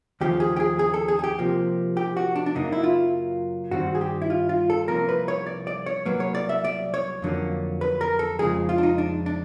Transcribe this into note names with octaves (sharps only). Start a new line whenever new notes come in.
D#2 C#3 F3 A3 G4
G#4
G4
G#4
G#4
A4
G#4
G#4
G4
C3 F3 A#3
G4
F#4
D4
D4
F#2 C#3 F#3 A#3 D#4
E4
F4
G2 D#3 G3 C4 F#4
G#4
G4
E4
F4
F4
A4
C2 C3 F3 A#3 C#4 A#4
B4
C#5
D5
D5
C#5
C2 B2 F#3 A#3 B4
C#5
D5
E5
D5
C#5
F2 D3 F#3 A#3 C#4
B4
A#4
A4
F2 C#3 F3 G#3 G#4
F4
D4
D#4
D4
D4